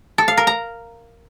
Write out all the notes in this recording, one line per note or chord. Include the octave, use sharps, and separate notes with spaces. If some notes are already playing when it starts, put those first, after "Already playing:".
A4
F5
A#4
A#5